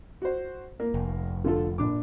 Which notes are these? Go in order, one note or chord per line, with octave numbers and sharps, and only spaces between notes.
F#4 C5
A#3
F1
D3 F4 A4
A#1 D4 D6